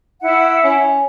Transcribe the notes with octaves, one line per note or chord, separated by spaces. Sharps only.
E4 E5 F#5
C#4